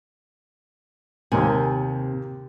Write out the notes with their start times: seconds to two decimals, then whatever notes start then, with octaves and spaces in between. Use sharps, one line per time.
1.32 D#2 C3 A#3 G#5